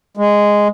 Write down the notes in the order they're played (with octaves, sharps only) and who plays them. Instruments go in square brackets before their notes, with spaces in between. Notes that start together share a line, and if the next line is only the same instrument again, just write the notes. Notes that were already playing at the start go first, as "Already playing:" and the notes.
[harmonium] G#3